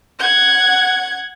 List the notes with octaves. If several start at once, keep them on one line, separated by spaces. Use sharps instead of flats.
F#5 G#6